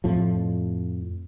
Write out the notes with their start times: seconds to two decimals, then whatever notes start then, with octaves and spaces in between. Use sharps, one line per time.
0.04 F2 A2 F3